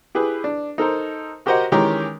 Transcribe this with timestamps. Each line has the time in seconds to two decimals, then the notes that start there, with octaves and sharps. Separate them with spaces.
0.15 E4 G4 G#4 B4
0.44 D4
0.78 D#4 A4 A#4 C5
1.46 F#4 G4 A#4 C5 D#5 F#5
1.72 D#3 E3 G#3 C#4 G4 A#4